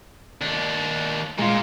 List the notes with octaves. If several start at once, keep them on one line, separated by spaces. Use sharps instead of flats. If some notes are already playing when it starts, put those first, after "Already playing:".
D#2 D4
A#2 G#3 F4